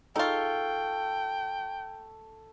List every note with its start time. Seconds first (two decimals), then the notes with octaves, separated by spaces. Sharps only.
0.16 D#4 F4 A4 G5 C#6